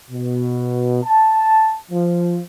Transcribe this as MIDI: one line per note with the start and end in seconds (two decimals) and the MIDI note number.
0.11 1.00 47
1.04 1.78 81
1.91 2.40 53